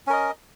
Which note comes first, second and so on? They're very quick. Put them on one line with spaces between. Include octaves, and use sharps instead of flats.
C#4 A#4 D#5